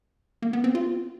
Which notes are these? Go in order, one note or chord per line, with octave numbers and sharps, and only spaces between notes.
A#3
B3
C4
F4